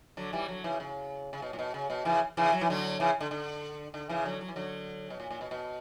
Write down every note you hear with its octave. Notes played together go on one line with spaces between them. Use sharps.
D3 F#3
E3 G3
D3 F#3
C#3 E3
C#3
C#3
B2
A#2
B2
C#3
B2
C#3 E3
C#3 E3
F#3
E3
D3 F#3
C#3 E3
D3
D3
D3
C#3 E3
D3 F#3
F#3
E3
D3 F#3
B2
A#2
A#2
B2
B2